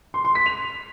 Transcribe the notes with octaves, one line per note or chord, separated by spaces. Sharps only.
C6
C6
B6
F7